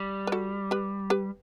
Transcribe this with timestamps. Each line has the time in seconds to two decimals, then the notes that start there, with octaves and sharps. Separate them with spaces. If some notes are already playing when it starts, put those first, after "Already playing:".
Already playing: G3
0.27 B4
0.32 F#4 A4
0.71 G4 B4
1.10 G4 B4